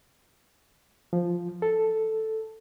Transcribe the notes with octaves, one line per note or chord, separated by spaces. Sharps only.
F3
A4